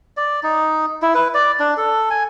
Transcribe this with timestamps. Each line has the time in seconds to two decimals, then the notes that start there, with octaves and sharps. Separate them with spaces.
0.17 D5
0.43 D#4
1.02 E4
1.15 B4
1.34 D5
1.60 D4
1.77 A4
2.10 G#5